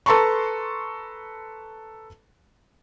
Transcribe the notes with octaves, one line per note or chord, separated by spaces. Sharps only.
A4 B4 A5 A#5 C6 C#6